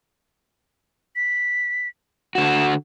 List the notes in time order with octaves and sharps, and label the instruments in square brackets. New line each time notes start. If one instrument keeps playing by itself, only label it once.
[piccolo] B6
[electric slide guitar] D3 F#4 [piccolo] E7